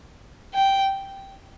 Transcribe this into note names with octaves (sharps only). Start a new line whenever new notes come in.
G5